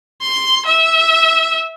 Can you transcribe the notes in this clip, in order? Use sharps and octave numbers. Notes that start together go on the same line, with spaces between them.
C6
E5